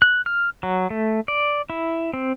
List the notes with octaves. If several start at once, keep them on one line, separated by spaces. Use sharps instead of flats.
F#6
F6
F#3
A3
D5
E4
C4